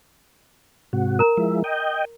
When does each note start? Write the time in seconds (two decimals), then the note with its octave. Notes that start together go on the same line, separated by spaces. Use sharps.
0.93 G#2 C3 F#4
1.19 A#4 A#5
1.37 F3 G#3 E4
1.64 D#5 G5